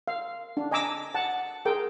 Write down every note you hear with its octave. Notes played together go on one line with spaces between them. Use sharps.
F5
D4
D#5 G#5 A#5 D6 E6
F#5 A5
G#4 A#4 G5